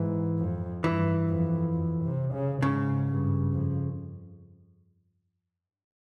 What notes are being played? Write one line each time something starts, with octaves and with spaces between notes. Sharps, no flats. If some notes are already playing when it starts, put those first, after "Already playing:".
Already playing: G#2 E3
F2
G2 E3
F2
F2
C3
C#3
G#2 C#3
G2
F2